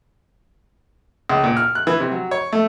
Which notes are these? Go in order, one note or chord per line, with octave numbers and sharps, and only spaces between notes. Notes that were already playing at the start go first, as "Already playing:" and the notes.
C#2
A#2
F6
F#6
E3
C3
F#3
C#5
A3